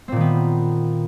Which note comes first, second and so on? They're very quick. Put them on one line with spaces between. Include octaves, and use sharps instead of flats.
C4 A#2 D#3 B3